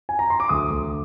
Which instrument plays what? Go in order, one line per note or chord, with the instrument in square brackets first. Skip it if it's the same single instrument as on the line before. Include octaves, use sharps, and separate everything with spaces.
[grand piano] G#5
A#5
C6
D6
D2 D#6
D2